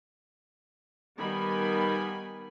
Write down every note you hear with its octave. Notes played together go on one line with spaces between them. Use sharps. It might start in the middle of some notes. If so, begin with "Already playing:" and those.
D#3 G3 B3 G#5 B5